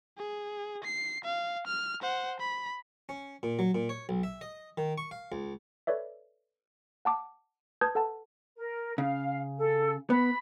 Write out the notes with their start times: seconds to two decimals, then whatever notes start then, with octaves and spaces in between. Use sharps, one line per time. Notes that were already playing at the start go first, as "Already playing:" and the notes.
0.17 G#4
0.84 C7
1.24 F5
1.67 F6
2.02 C5 F#5
2.40 B5
3.09 C#4
3.43 A#2
3.59 F#3
3.75 A#2
3.89 C#5
4.09 B1
4.23 E5
4.41 D#5
4.78 D#3
4.98 C#6
5.11 F5
5.32 C#2
5.87 A4 B4 C#5 D5 E5
7.05 F#5 A5 D6
7.81 B4 A5 D#6 G6 G#6
7.95 A4 F#5 A5
8.56 A#4
8.98 C#3 F5
9.57 A4
10.10 B3 B5